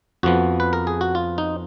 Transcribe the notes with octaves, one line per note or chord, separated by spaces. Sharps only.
F2 F3 B3 F#4
B4
A#4
G#4
F#4
F4
D#4